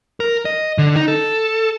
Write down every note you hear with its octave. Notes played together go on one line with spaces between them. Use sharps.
A#4
D#5
D3
D#4
A4